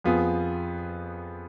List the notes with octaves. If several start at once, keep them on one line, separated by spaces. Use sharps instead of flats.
F2 F3 B3 F4 G#4